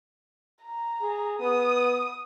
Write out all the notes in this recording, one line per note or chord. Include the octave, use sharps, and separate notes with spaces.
A#5
G#4
B3 D#6